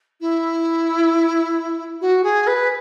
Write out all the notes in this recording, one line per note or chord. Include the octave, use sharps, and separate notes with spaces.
E4
F#4
G#4
B4